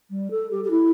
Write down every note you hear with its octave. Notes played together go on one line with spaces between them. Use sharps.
G3
A4
G4
G4
E4